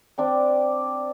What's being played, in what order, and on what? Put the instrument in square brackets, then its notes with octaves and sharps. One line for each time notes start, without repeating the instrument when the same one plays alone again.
[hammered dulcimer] C4 D4 G5